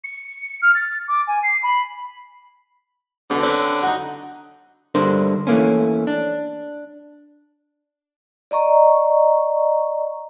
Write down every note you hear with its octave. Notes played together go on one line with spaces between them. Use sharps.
C#7
F6
A6
D6
G#5
C7
B5
B2 D3
C4 C#4 B4
D#4 F#4
G2 D3 D4 A#4 C5
E3 A3 A#3 C#4
D4
D5 D#5 A#5 C#6